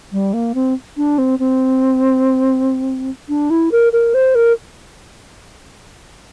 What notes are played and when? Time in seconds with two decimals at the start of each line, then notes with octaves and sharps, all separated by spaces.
0.12 G3
0.34 A#3
0.55 C4
0.97 D4
1.18 C4
1.39 C4
3.29 D4
3.50 E4
3.72 A#4
3.93 A#4
4.14 C5
4.35 A#4